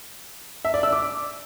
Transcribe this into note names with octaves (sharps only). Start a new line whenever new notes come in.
E5
D5
E6
D6